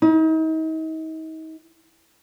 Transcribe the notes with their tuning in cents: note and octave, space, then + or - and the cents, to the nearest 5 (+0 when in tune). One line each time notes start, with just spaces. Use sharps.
D#4 +40